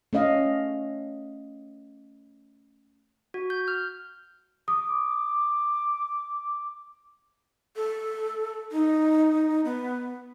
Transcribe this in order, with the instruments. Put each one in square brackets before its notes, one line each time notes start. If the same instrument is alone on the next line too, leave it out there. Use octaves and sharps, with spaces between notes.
[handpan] A3 C#4 D#5 F5
[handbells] F#4
G6
F6
[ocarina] D6 [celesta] D#6
[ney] A4
D#4
B3